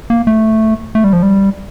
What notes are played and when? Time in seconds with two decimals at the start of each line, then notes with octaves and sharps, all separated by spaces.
0.10 A#3
0.27 A3
0.95 A3
1.04 G3
1.13 F3
1.23 G3